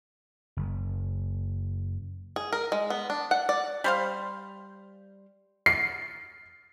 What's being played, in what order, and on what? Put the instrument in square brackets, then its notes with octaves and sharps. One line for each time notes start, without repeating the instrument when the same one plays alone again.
[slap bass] F#1
[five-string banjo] G#4
A#4
G#3
B3
D4
F#5
D5
[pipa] G3 C5 F5
[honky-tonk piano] C7